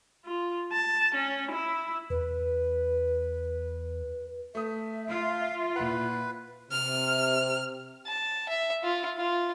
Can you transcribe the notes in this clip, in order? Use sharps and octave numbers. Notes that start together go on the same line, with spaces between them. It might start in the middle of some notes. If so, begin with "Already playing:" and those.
F4
A5
C#4
E4
E2 B4
A3 E5 D#6
F4 F5
A#2 E4 B4 F#5
C3 F6
A5
E5
F4
F4